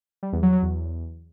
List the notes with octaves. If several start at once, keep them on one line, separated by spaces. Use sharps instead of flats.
G3
E2
F#3
F#3
E2